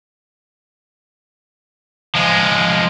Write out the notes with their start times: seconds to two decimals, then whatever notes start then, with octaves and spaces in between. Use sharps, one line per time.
2.15 F3 G#3